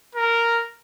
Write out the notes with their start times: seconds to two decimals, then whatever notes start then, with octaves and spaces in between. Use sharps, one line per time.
0.15 A#4